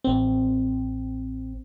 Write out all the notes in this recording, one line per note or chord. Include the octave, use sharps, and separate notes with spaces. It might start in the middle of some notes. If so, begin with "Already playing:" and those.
A1 C4